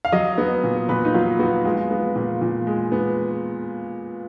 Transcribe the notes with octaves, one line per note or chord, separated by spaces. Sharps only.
F5
F#3 D#5
B3
A#2
A#2 B4
D#4
F#3 F4
B3 F#4
G#3 F4
B3
A#2
A#2
G#3
B3